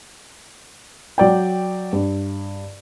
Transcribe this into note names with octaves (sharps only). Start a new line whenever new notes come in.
F#3 D5 G5
G2